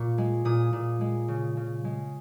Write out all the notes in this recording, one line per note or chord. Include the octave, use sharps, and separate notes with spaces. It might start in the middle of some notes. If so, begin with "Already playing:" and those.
Already playing: A#2 C#6
G#3
A#2 D#6
A#2
G#3
C#3
C#3
G#3